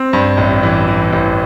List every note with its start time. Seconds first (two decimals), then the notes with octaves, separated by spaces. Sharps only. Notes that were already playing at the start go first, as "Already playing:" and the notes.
Already playing: C4
0.13 G2
0.38 A1
0.63 E3
0.88 E3
1.13 A1